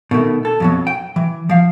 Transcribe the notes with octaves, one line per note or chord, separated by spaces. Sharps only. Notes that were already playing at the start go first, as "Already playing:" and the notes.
B2 D#3 A3
A4
F2 B2 F#3
G5
E3
F3 F5